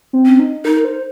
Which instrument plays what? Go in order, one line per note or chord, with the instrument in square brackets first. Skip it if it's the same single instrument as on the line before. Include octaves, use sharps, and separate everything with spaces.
[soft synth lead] C4
[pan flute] C#4
[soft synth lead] D#4
[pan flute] D#4 [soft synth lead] A#4
[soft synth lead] A#4
C5